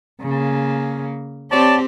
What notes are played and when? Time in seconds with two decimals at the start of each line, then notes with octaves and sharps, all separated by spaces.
0.22 C#3 A#3
1.52 C4 G4 C#5 D5 A5